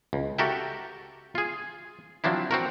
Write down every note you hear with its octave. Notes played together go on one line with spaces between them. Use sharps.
C#2
F#4 G4 A4 A#4 E5 G5
F4 G#4
F3 F#3 C4 D4 E4
C4 F#4 A#4